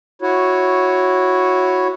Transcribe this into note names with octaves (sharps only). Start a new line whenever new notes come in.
E4 F#4 C#5